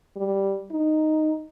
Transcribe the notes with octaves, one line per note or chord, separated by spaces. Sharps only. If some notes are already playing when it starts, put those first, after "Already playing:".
G3
D#4